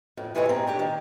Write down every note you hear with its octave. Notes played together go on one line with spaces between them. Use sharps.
F2 A2
C3 E3 G#3 A3 E4 C#5
C3 C4 C#4 A#5
A3 D4 G4 C#5
D#3